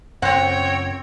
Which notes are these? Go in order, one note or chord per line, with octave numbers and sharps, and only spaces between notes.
F#2 A#2 C#3 C4 C#5 F#5 G5